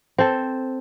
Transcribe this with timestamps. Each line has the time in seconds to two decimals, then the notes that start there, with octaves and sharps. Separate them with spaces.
0.18 C4 A4